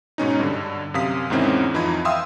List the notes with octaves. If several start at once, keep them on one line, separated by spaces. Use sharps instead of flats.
G#2 B2 C#4 D#4
G2 D3
F#2 C3 F5 D#6 B6
E2 G#2 D#3 C4 C#4 E4
F2 E3 D#4 F4 B5 G#6
E5 F5 G5 C6 D#6 E6